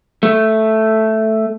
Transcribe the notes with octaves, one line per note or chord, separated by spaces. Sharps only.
A3